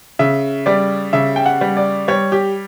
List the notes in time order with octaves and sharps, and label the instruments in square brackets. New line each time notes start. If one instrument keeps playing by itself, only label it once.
[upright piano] C#3 E5
G3 D5
C#3 E5
G5
F#5
G3
D5
G3 C#5
G4